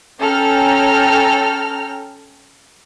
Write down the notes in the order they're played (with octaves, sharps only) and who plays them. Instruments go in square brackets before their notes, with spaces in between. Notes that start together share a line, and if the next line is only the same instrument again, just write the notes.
[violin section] C#4 A4 G5 A#5 F6